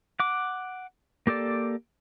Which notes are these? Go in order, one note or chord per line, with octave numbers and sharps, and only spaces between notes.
F#5 D6
A#3 G4 A4 D5